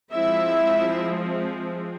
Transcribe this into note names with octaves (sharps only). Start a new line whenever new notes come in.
F3 G#3 C4 E4 E5